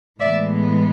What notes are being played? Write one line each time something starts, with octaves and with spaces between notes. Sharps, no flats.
A2 E3 G#3 B3 D5 E5